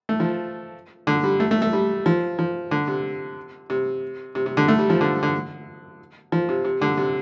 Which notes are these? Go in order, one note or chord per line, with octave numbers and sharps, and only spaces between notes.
A3
F3
D3
G3
A3
A3
A3
G3
F3
F3
D3
C3
C3
C3
C3
D3
A3
G3
F3
D3
D3
F3
C3
C3
D3
C3